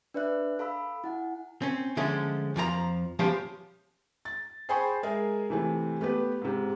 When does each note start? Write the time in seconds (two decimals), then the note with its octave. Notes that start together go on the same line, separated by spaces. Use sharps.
0.14 D4 B4 D5 E5 F#6
0.59 A4 F5 B5 E6
1.04 E4 F#5 G#5
1.62 C4 C#4
1.97 D3 F3 G#3 A3 C#4
2.56 F2 F3 G4 A#5
3.19 F3 G#3 B3 C#4 G4 C5
4.25 A6
4.69 G#4 C5 G5 G#5 B5 C#6
5.03 G#3 G#4 A#4 E5
5.50 C3 E3 A3
6.01 A3 B3 G4 B4
6.42 G#2 C3